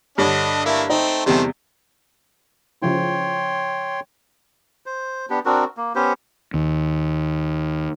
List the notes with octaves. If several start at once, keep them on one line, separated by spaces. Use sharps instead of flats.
G2 D3 D4 C#5 D#5
A3 A#3 E4
A3 C4 D#4
E2 C3 D#3 G3 A3 C5
C#3 F3 E4 C#5 G5 C6
C5
B3 D4 G4
C4 D4 F#4 A#4
A#3
B3 C#4 G4 C5
D#2